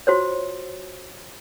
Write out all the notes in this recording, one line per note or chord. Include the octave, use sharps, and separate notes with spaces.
F4 F#4 C5 C#5